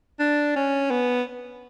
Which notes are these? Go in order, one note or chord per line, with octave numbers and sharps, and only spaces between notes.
D4
C#4
B3